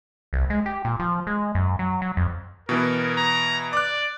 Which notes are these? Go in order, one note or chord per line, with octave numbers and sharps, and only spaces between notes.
C2
G#3
G4
A#2
F3
G#3
F#2
F#3
F#3
F2
B2 E3 B3 A#4
A#5
D5 D6 F#6